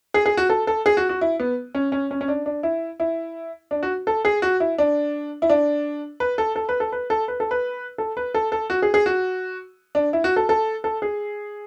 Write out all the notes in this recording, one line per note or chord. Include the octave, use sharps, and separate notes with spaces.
G#4
G#4
F#4
A4
A4
G#4
F#4
F#4
E4
B3
C#4
C#4
C#4
C#4
D4
D4
E4
E4
D4
F#4
A4
G#4
F#4
E4
D4
E4
D4
B4
A4
A4
B4
A4
B4
A4
B4
A4
B4
A4
B4
A4
A4
F#4
G#4
G#4
F#4
D4
E4
F#4
A4
A4
A4
G#4